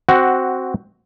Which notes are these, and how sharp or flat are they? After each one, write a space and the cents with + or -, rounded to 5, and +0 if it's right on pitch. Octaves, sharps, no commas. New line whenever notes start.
C4 +0 F#4 +10 F#5 +0